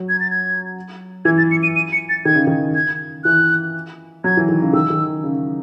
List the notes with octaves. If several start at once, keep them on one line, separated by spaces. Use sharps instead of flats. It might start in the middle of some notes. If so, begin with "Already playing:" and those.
Already playing: F#3
G#6
A6
G#6
E3 G#6
A6
C#7
D#7
D#7
C#7
A6
D#3 G#6
C#3
D#3
G#6
E3 F#6
F#3 G#6
E3
D#3
C#3
D#3 E6
D#3
C#3